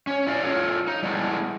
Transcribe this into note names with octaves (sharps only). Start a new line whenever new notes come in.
C#4 C#5
E4 D5 F5
F4 A4 C#5
D#4
G3 G#3 B3 E4 A4